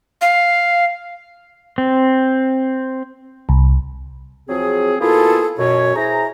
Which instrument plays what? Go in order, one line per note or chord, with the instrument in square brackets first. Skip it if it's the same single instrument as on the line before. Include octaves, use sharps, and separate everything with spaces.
[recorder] F5
[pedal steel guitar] C4
[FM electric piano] C2
[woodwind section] F3 F#3 C4 G#4
B2 A#3 E4 F4 G#4 A4
F#2 B2 C#5
E4 G#4 C5 A#5